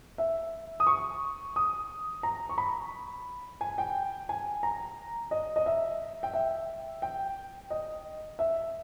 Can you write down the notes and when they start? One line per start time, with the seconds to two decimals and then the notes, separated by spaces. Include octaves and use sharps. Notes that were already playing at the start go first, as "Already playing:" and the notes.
0.18 E5
0.80 D#6
0.87 C#6
1.56 D#6
2.23 A#5
2.49 C#6
2.58 B5
3.61 G#5
3.78 G5
4.29 G#5
4.63 A#5
5.31 D#5
5.56 D#5
5.66 E5
6.23 G5
6.34 E5
7.02 G5
7.70 D#5
8.39 E5